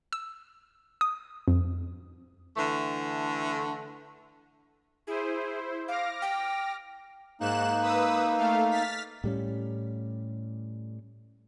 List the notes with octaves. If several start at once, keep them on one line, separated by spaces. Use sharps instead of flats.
E6
D#6
F2
D3 E3 A3
E4 G#4 C5
F5 D6 F6 A#6
G5
G#2 A#3 D#4 F#6 E7
B4 D#6 E6
A3 F5
F6 A6 B6
A2 G3 C#4